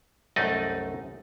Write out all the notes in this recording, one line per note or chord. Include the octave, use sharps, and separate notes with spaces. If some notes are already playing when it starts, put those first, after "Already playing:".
C2 F#2 A3 D#4 D5 D#5